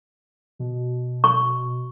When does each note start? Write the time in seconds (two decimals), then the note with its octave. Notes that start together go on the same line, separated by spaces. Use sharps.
0.59 B2
1.24 C#6